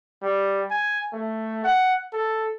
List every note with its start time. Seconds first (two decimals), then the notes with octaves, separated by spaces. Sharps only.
0.23 G3
0.71 G#5
1.13 A3
1.64 F#5
2.13 A4